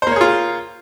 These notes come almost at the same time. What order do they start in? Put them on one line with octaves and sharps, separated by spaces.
C5 A#3 C#5 G#4 F4